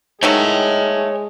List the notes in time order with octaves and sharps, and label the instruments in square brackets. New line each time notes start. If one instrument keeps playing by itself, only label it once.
[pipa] D#3 F#3 A3 [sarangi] G#3 [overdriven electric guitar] C#5 G5